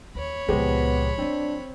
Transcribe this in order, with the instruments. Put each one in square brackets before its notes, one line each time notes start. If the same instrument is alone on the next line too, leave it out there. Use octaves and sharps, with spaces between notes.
[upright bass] D#2 [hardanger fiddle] C#5 B5
[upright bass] C#2 A#2 [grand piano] F3 G#3 G4 [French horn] B3
[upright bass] F#3 F4 [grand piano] C4 [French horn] D4